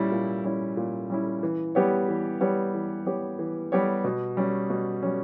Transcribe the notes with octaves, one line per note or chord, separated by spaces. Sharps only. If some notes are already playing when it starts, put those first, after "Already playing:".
Already playing: A#2 G3 C#4 E4
A#2
G3 C#4 E4
A#2
G3 C#4 E4
E3
G3 B3 G4 C#5
E3
G3 B3 G4 C#5
E3
G3 B3 G4 C#5
E3
G3 B3 G4 C#5
B2
G3 C#4
B2
G3 C#4